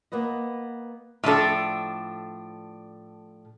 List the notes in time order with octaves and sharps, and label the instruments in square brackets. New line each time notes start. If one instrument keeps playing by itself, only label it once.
[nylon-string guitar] A#3 B3 B4 D#5
[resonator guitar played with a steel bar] A2 F3 D4 A4